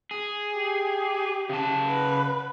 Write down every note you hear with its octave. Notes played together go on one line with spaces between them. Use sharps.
G#4
G4
C#3 A5
B4